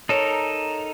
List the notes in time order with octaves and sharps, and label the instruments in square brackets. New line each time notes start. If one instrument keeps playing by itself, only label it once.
[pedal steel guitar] D#4 A4 A#4 [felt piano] C#5